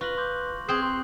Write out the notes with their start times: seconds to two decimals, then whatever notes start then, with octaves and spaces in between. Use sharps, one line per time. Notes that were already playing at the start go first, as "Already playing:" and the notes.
0.01 F4 B4 C#6 A#6 F#7
0.17 C6 D6 G6
0.69 C4 G#4 C5 D#6 F#6 F#7
0.83 C6